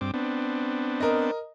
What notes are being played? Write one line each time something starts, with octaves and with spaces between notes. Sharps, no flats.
G2 C4 D6
B3 C4 D4
A#4 D#5